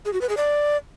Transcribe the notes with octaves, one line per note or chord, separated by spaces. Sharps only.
G#4
F#4
B4
G#4
D5